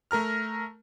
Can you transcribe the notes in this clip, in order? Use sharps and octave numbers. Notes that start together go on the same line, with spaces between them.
A3 A#4 A#5 F6